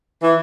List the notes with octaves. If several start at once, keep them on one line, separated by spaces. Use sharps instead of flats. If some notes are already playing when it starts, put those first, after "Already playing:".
E3